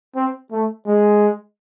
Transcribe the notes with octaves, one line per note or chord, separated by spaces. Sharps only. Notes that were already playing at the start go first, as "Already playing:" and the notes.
C4
A3
G#3